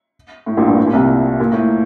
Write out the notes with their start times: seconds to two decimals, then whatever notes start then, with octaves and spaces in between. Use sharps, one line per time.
0.46 A2
0.57 A#1 A#2
0.67 G2
0.78 A2
0.87 A#2
0.93 C2 C3
1.40 A#2
1.52 A2